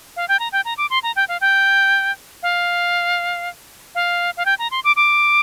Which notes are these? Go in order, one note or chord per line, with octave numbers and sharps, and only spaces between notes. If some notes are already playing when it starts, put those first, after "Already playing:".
F5
G5
A#5
G5
A#5
D6
C6
A#5
G5
F5
G5
F5
F5
F5
G5
A#5
C6
D6
D6